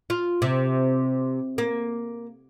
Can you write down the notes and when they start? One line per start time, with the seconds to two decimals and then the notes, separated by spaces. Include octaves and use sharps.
0.10 F4
0.42 C3
1.58 A#3